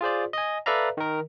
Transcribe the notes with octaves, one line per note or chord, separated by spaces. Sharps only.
F4 G#4 C5 D5
D#5 G#5
A4 B4 D5 E5 F5 A#5
D#3 A#4